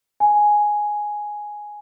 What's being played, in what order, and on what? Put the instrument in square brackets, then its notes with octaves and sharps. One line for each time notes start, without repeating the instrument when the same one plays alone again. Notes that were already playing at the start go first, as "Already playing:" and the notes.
[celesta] G#5